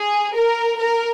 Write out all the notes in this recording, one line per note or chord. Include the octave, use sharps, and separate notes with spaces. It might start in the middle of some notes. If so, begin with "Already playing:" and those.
Already playing: G#4
A#4
A#4